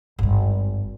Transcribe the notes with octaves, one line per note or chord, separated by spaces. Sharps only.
G#1 G2